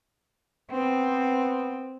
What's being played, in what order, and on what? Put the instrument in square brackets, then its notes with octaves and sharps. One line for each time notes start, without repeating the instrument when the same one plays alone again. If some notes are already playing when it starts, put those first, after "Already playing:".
[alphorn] B3 [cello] C4